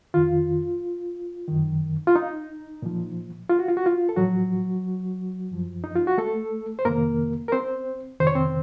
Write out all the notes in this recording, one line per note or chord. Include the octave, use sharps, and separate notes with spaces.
F2 D#3 F4
F#2 D#3
F4
D#4
A#2 F3
F4
F#4
F4
F#4
F4
A4
A2 F3 F#3 F#4
F#2 F3
D#4
F4
F#4
A3 A4
C5
F2 C3 D#3 A#3 A#4
A#4
C4 C5
F2 C3 D#3 C5
C#5
C4 C5